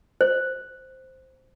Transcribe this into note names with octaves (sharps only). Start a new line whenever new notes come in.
C5